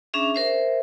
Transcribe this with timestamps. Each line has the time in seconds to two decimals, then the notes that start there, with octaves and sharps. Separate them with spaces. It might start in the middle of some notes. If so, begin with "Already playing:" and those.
0.14 C#4 D4 G#4 E5
0.35 A#4 C5 E5